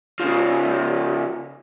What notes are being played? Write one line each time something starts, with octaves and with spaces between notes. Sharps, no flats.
C#3 F3